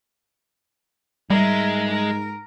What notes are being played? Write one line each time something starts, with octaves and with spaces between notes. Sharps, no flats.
G#2 G3 G#3 A#4 E5
A#4